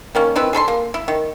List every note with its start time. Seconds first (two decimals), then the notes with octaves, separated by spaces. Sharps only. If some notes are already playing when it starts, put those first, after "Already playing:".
0.15 D#3 A#3 C#4
0.36 D#3 C4 E4 B4
0.53 G#4 A4 B5 C6
0.68 A#3
0.94 E4
1.08 D#3